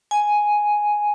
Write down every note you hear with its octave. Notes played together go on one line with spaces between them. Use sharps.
G#5